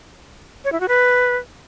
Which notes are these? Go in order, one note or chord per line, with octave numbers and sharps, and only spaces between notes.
C#5
E4
F#4
B4